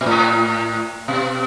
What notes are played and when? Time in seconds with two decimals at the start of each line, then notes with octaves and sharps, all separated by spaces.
0.01 A#2
0.06 A2
1.08 B2